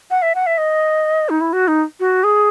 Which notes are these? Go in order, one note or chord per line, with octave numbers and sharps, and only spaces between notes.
F#5
E5
F#5
E5
D#5
D#4
E4
F#4
D#4
F#4
G#4